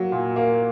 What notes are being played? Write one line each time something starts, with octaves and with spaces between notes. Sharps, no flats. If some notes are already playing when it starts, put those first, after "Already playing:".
Already playing: F#3 A#3
A#2
A#3